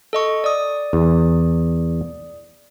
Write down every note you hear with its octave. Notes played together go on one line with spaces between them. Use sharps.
A4 D#5 C#6
D5 D#6
E2